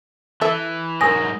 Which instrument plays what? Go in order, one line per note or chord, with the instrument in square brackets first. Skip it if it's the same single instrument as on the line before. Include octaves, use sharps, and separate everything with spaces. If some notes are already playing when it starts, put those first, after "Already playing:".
[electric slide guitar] E3 [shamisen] A4 E5
[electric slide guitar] G#2 F#3 [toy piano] A#4 G#5 [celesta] D#6 A#6